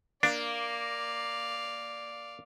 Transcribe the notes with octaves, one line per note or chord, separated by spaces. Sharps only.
A#3 D4 D5 F5